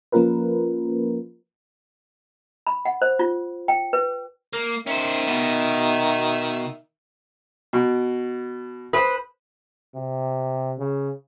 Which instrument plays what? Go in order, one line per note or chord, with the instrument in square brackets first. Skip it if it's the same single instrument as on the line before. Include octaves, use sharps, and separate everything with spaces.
[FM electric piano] F3 A#3 C#4 F4 A#4 B4
[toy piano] B5
F#5
C5
F4
G5
B4
[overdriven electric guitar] A#3
[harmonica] D#3 E5 [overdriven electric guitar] C#4 C5
[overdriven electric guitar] B2
[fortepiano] B2
[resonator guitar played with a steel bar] B4 [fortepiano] C5 D#6
[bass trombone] C3
C#3